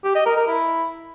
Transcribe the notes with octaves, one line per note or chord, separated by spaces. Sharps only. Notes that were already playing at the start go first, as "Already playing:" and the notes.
G4
D#5
A#4
A#4
E4